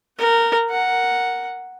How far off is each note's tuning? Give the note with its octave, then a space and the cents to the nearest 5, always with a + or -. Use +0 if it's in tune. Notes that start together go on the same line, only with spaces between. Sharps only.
A#4 -15 F#5 +30
A#4 +0 F#5 +0